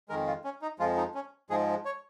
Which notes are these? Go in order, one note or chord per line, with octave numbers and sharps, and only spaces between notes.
F2 D#3 G#3 A#4
F4
C#4
D#4
F2 F3 G#3 F4
D#4
C#4
G#2 F3 G#3 G#4
C#5